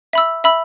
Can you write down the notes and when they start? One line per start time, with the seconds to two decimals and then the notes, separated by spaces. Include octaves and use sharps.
0.13 E5 B5 E6
0.44 E5 B5 E6